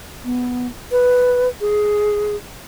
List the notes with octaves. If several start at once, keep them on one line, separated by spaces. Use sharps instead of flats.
B3
B4
G#4